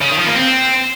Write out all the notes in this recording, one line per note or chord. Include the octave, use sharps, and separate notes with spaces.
C#3
D#3
F3
A#3
C4